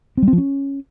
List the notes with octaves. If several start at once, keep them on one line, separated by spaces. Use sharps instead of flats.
C4
G3
C4
F3
C#4